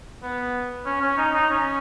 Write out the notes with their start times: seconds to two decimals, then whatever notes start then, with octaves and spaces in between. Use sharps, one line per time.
0.23 B3
0.86 C#4
1.02 C#4
1.17 D#4
1.34 D#4
1.50 C#4